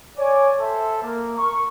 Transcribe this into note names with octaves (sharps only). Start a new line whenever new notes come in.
C#5 D5 G#5
A4 C5 E5
A#3 A#4
C#6